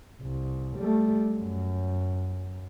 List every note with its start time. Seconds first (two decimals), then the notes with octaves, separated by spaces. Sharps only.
0.21 C2
0.78 G3 A3
1.35 F#2